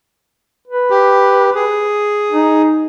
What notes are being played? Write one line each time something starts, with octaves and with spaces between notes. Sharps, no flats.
B4
G4
G#4
D#4